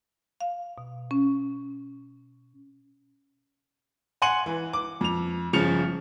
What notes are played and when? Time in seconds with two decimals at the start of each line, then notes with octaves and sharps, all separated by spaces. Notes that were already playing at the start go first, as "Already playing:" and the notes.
0.41 F5
0.78 B2
1.11 C#4
4.22 F#5 G#5 C6 C#7 D#7 F#7
4.46 E3
4.73 D6
5.01 F2 F7
5.53 G1 C#3 F3 C#7 F7